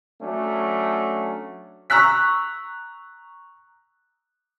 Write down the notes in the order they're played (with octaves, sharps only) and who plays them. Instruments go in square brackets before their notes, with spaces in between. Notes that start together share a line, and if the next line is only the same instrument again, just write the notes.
[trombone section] F#3 A3 C#4 D4
[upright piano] A#5 C#6 E6 F#6 B6